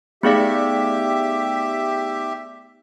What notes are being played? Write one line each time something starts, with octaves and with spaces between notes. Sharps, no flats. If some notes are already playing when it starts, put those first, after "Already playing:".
A3 B3 D#4 G4 G#4 D5 E5 F5